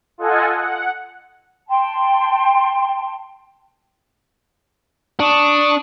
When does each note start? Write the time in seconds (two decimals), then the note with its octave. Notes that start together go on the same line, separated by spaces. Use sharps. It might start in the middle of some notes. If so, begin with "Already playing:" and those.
0.18 F4 A4 D#5 F#5 G#5
0.56 F#5
1.69 G5 A5 C6
5.20 D4 C#6 D#6